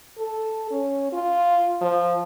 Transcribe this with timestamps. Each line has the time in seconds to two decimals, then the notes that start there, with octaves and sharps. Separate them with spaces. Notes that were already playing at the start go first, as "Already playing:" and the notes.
0.19 A4
0.71 C#4
1.13 F4
1.81 F3